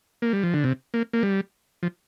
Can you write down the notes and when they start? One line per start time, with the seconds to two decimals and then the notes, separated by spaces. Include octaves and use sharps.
0.22 A#3
0.33 G3
0.44 F3
0.54 D3
0.64 C3
0.94 A#3
1.13 A#3
1.23 G3
1.83 F3